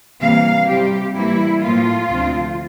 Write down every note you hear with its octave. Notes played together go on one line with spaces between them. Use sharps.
C3 E3 G3 A#3 F5
C3 G3 C4 G4
A2 E3 G3 A#3 E4
A2 F3 A#3 F4
D2 C3 F3 C4